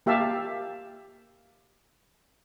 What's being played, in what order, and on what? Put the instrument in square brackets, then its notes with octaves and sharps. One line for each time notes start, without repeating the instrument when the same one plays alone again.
[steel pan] A#3 G4 E5 F5 A5